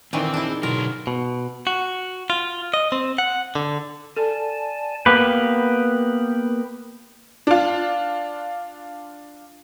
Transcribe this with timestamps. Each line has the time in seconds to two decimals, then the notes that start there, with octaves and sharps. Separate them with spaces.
0.13 A#2 D#3 E3 C4 D4 D#4 A#4
0.34 D4 E4 G#4
0.63 B2 D3 F#3 A#4 C6
1.07 B2
1.67 F#4
2.30 F4
2.74 D#5
2.92 C4
3.18 F#5
3.55 D3
4.17 A4 D5 G#5 A5
5.06 A#3 B3 G4 B4
7.47 D4 F4